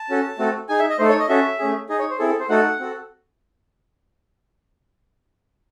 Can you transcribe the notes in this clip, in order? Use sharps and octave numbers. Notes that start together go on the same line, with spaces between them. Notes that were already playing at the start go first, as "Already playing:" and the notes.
Already playing: A5
C#4 F#4 A4
A3 C4 F#4 A4
D#4 G#4 G#5
E5
D#5
A3 D#4 A4 C5
C#5
D#5
C#4 F#4 A4 E5
A3 C#4 G#4
D#4 G#4 D#5
C#5
C5
C4 E4 G#4 A4
A4
C5
A3 D#4 F#4 A4 F#5
C4 F#4 A4